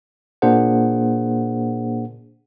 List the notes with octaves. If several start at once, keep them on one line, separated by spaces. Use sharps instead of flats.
A#2 A#3 D4 G#4 C5 F#5